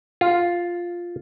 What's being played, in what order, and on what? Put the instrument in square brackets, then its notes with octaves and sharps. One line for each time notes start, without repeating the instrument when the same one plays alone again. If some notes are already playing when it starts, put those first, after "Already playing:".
[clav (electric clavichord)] F4